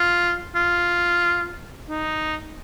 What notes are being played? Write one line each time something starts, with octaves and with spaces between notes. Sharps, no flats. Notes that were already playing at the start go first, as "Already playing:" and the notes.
Already playing: F4
F4
D#4